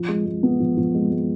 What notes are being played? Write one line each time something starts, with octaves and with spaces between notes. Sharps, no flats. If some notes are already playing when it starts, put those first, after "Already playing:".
Already playing: F3
G#3
G#3
B3
F3
F3
G#3
G#3